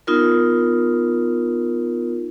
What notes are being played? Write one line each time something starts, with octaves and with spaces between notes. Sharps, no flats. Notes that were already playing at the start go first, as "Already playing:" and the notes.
B3 D#4 F4 A#4